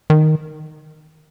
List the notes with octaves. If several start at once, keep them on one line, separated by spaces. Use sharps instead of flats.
D#3